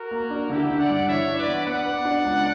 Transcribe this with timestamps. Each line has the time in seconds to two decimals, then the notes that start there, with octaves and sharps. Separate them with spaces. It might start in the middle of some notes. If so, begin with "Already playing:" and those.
Already playing: F#4 A#4
0.11 A#3
0.30 D4
0.50 D3 E4 G4
0.70 D3
0.79 D5 F#5
0.89 G2
1.08 E3 C#5 E5
1.28 D4
1.38 B4 D5
1.47 B3
1.66 B3 D5 F#5
1.85 B3
2.05 D4
2.25 C#2